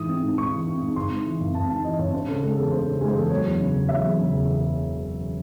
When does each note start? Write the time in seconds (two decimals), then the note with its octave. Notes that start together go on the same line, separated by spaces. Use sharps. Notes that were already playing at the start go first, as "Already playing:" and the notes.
Already playing: G#2 E3 D#6
0.09 C4
0.23 G#2
0.37 G#2 C#6
0.52 E3
0.67 C4
0.81 G#2
0.96 G#1 C6
1.11 G#2
1.26 E3
1.40 G#1
1.54 G#1 A5
1.69 G#2 A5
1.84 E3 D#5
1.98 G#1 C#5
2.13 C#4 C5
2.28 C#3 A4
2.43 G#3 A4
2.57 E2 A4
2.72 C#4 C5
2.86 C#3 A4
3.01 G#3 G#4
3.08 C5
3.15 E2 A4
3.30 F#3 C#5
3.46 E2
3.60 C#3
3.75 E1
3.89 F#3 E5
4.04 E2
4.18 C#3
4.34 E1